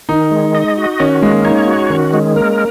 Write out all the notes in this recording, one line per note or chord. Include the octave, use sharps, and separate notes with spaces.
D#3 D#4
G#3
D#5
F#4
D#3 C#4
G#3 A#3
D#4 C#5
F#4
D#3 C#4
G#3
A#3 A#4